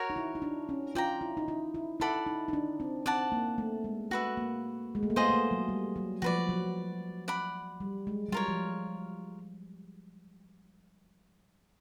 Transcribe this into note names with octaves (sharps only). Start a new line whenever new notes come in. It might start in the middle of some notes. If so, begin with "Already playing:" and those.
Already playing: F#4 A#4 C#5
D#4
E4
D#4
D4
C#4
F4 D5 G5 A#5
E4
D#4
E4
E4
E4 A4 D5 F#5 B5
D#4
D#4
D4
C4
C4 D5 F#5 A5
A#3
A3
G#3
A3 F#4 B4 E5
A#3
G#3
A3
A#3
B3 F4 G#4 C5 D#5
A3
A#3
F#3
G3
F#3
F3 F#4 B4 D5
F#3
D5 F#5 B5
G3
G#3
F#3
G3 F4 A#4 C#5
F3